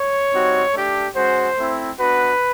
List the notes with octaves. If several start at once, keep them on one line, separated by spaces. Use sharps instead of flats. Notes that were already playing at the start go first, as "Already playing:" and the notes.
Already playing: C#5
G3 C4 D#4 F#4
A3 D4 G4
G#3 C#4 F#4 C5
A3 C4 E4
B3 D4 F#4 B4